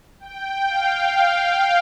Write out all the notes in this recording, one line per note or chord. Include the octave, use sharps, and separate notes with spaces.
G5
F5